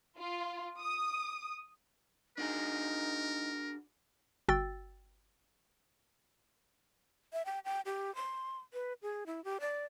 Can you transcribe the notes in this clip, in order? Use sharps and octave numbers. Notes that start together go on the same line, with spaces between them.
F4
D#6
D4 D#4 F#4 G#4 A#4
G1 F#4 G5 E6 A6
E5
G5
G5
G4
C6
B4
G#4
E4
G4
D5